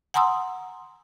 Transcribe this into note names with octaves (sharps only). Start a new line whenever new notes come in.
F#5 G#5 A#5 C6 D#6 E6